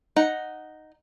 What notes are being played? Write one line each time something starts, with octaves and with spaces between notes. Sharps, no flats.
D#4 F#5